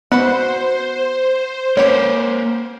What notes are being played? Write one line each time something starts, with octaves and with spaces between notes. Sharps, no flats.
B3 F#4 B4 C5 F#5
A#3 C#4 G4 B4 C#5